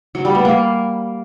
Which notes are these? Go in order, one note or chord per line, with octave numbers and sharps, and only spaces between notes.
F#3
G3
B3
A#3